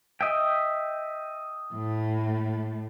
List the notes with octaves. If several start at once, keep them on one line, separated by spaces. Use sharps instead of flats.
D#5 E5 G5
A2 A3